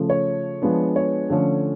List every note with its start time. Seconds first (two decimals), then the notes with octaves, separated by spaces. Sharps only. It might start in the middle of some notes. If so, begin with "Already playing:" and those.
Already playing: C#3 F3 A3
0.10 C#5
0.62 F3 G#3 B3 D4
0.96 C#5
1.30 D3 F3 A3 C#4